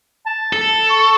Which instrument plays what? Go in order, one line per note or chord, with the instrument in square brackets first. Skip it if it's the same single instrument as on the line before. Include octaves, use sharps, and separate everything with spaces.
[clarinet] A5
[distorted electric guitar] A4
[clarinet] C#6